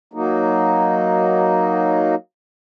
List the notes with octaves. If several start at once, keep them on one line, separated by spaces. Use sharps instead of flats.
F#3 A#3 D#4